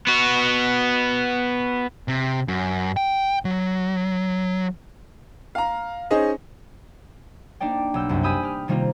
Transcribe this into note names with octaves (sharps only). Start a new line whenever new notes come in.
B3 F#4
C3
F#2
G5
F#3
F5 A#5
C#4 D#4 G#4 C5 D#5
A#3 D4 D#4 D5 G5
B1 E6 G6
C2 F#2
G4 G#5 B5 D#6 E6 G6
G4 F6
C3 D#3 G3 A#3 C4 F4